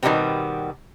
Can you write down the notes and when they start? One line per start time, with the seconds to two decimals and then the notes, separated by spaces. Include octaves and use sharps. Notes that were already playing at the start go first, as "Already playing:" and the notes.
0.03 B2 D#3 E3 G3 B3 C4